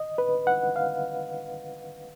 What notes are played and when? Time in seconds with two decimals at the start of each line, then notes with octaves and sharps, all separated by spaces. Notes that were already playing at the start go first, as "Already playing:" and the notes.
Already playing: D#5
0.18 B4
0.47 F#5
0.76 F5